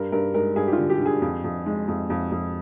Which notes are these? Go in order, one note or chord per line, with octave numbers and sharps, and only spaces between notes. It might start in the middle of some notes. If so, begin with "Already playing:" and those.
Already playing: G2 A#4
G2 A#4
G#3 A#4
G2 G#4
G4
F4
D3
G4
D3 G#4
F2
F2
G#3
F2
F2
F2